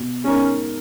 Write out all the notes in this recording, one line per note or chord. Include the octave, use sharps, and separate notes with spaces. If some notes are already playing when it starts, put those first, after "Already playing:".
Already playing: B2
G#3 C#4 D#4 A#4